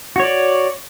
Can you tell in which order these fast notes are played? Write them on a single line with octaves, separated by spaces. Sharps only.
F#4 C#5 D5